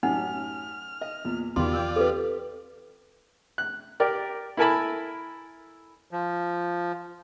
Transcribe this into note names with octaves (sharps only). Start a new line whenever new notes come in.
A1 F#2 D#4 F#5 G#5 F6
D#5
E2 A#2
E2 B2 D#3 F4 G4 D5 C6
G5 E6
C4 G4 A4 B4
F#6
G4 A#4 D5
E4 A4 A#4 G#5 A5 B5
F3